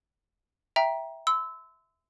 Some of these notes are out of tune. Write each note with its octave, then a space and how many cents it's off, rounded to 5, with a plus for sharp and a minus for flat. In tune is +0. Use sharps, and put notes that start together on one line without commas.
E5 +0 G5 +0 A#5 +20
C6 -35 E6 -15